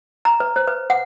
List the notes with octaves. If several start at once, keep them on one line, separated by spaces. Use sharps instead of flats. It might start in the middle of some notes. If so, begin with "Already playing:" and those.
A#5
B4
C5
B4
F#5